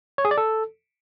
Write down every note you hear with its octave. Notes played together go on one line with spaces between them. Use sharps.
C#5
G#4
D5
A4